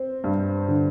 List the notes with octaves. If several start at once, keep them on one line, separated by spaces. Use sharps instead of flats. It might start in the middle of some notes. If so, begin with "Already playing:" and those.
Already playing: C4
G2
D3